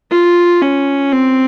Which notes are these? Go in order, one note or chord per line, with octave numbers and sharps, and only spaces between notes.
F4
C#4
C4